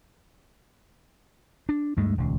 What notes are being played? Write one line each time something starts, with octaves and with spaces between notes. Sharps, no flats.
D4
D2 G2 G#3 A3
D#1 C#2